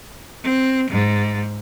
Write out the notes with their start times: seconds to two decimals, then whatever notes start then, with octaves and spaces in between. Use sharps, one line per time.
0.43 C4
0.90 G#2